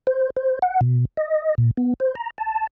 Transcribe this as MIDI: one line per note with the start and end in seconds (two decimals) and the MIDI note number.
0.07 0.30 72
0.37 0.59 72
0.62 0.81 78
0.81 1.05 47
1.17 1.55 75
1.58 1.71 46
1.77 1.94 59
2.00 2.15 72
2.15 2.30 82
2.38 2.67 81